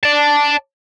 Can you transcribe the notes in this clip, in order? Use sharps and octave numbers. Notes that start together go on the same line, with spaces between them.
D5 A5